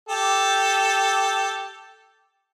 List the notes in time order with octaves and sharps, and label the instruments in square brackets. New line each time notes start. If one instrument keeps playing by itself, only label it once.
[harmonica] G4 A4